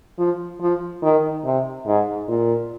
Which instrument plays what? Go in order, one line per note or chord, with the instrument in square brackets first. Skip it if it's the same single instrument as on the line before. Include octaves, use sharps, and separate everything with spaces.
[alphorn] F3
F3
D#3
C3
G#2
A#2